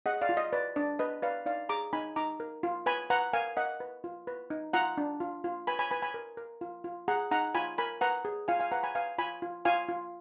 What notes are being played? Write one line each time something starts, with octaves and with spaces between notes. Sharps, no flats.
G#4 D#5 F#5
D5 F5
F4
D#5
B4 D5
D4 D5
B4 D#5
B4 D5 F5
D#4 D5 F5
G#4 A#5 D6
D#4 G#5 B5
D#4 A#5 D6
A#4
F4
B4 G#5 B5
B4 F#5 A#5
A#4 F5 G#5
A#4 D#5 F#5
B4
F4
B4
D#4
F4 F#5 A#5
D4
F4
F4
B4 G#5 B5
G#5 B5
B4 G#5 B5
G#5 B5
A#4
A#4
F4
F4
G#4 F#5 A#5
D#4 F#5 A#5
F4 G#5 B5
A#4 G#5 B5
B4 F#5 A#5
G#4
F4 F5 G#5
F5 G#5
B4 F#5 A#5
G#5 B5
B4 F5 G#5
F4 G#5 B5
F4
F4 F5 G#5
F4